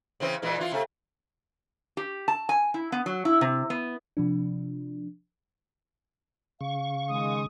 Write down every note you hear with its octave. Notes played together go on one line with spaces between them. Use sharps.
C#3 E3 C4
A#2 E3 G#3
E3 F4
C3 A3
G4
A5
G#5
E4
B3
F#3
E4
C3
B3
C3 F3 D4
C#3 F5 C#6
D#3 G#3 D#6